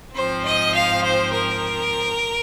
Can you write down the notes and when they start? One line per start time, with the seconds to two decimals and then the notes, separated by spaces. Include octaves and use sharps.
0.15 G#2 F3 C4 C5
0.44 D#5
0.74 F5
1.03 C5
1.32 A#4